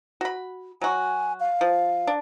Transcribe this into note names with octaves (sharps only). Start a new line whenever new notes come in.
F#4 B5
F#3 F#4 G#5
F5
F3
D4